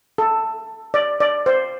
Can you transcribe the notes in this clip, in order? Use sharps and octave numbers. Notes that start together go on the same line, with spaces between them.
A4
D5
D5
C5